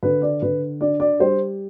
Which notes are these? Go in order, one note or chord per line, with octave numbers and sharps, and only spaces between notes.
D3 B4
D5
D3 B4
D4 D5
D5
G3 C5